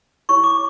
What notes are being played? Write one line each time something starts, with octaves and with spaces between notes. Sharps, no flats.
E4 G4 C#5 C#6
D6